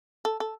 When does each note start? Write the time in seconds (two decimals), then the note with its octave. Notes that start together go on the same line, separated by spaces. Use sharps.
0.25 A4
0.40 A4